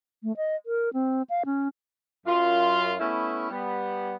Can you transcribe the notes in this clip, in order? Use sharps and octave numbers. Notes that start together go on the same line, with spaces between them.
A3
D#5
A#4
C4
F5
C#4
F#2 F4
A3 B3 C#4 E4
G3 B3